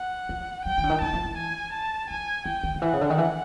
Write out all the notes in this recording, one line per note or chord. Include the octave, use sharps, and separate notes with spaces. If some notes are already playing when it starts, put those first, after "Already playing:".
Already playing: F#5
F3
F#3 G5
E3
D3
D#3
E3 A5
F3
E3
G#5
A5
F3 G#5
E3 G5
D#3
D#3
E3 F#5
C#3
D3
D#3
E3